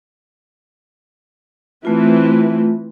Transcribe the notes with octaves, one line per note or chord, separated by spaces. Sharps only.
E3 A3 C4 F4 B4